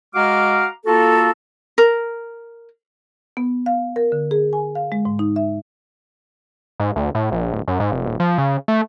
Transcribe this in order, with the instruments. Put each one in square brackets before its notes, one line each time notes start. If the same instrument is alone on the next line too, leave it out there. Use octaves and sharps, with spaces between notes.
[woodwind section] G#3 F#4 F5 A#5 D6 F6
A#3 F4 F#4 A4
[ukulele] A#4
[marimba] B3
F5
A#4
D3
G#4
G#5
F5
G#3
G#2
D#4
E5
[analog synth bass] G#2
D2
A2
A#1
D1
F#2
G#2
F1
D#1
F3
C#3
A3